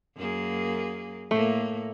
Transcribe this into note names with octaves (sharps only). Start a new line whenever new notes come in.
F#2 A#3 G#4
A2 A3 A#3